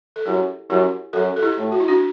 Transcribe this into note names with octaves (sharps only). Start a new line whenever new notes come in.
A4
F#2 E4 G4
F#2 E4 G4
F#2 F#4 A4
A4
E4 G4
A2
F#4
E4
D4 F#4